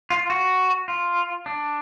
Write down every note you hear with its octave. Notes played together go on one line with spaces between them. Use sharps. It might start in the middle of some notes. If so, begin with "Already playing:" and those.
F4
F#4
F4
D4